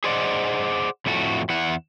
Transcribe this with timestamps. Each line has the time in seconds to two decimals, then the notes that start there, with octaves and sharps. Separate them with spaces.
0.04 G#4 C5 D5 D#5 F#5
1.06 F2 A2 A3 F#4
1.49 E2 E4 F#5